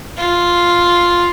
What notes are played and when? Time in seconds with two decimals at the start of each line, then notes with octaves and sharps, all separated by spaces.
0.18 F4